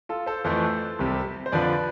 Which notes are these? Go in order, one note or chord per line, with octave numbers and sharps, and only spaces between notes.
F4 A4
A4 C5
F2 E3 A3 A4 C5
C2 C3 G3
C5
F2 D3 F3 B4 D5